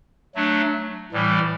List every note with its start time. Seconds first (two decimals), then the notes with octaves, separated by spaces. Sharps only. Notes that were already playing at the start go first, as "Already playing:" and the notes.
0.35 F#3 A3 D4
1.12 A2 E3 G3